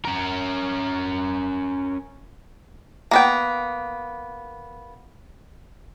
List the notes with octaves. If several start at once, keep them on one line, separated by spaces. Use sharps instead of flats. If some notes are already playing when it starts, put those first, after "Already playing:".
C#4 A#4
A#3 B3 G5